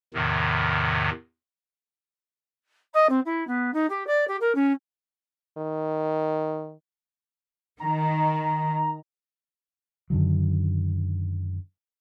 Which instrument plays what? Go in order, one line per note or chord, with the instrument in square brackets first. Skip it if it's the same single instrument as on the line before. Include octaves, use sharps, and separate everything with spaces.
[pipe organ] E2 A2 C3 D#3
[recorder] D#5
C4
E4
B3
D#4
G4
D5
G4
A#4
C#4
[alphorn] D#3
[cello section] D#3 [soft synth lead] A#5
[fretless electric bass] F#2 D3 D#3 F#3